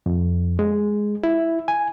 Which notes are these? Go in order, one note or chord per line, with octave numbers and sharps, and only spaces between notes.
F2
G#3
E4
G#5